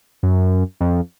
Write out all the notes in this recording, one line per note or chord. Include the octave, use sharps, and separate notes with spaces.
F#2
F2